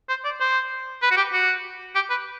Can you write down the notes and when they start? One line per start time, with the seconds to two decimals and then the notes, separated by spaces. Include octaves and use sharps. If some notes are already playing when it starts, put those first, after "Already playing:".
0.09 C5
0.24 D5
0.40 C5
1.02 B4
1.11 F#4
1.17 G4
1.33 F#4
1.95 G4
2.10 B4